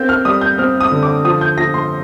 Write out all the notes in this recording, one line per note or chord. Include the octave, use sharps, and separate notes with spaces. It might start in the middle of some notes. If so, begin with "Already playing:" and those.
Already playing: A#3 C4 G6
F6
G3 D#6
G6
C4 F6
D#6
D3
D6
F3 D#6
G6
F3 A#6
C6